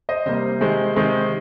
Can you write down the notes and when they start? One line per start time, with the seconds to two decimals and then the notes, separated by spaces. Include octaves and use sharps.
0.09 C5 D#5
0.26 C3 G3 A#3 C5
0.61 C3 D#3 G#3 C4
0.96 C3 D#3 G#3 C4